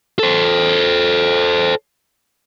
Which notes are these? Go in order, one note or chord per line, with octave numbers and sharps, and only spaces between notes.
A4 C5